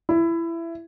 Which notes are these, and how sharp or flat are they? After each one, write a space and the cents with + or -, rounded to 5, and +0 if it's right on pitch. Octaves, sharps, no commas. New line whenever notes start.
E4 +20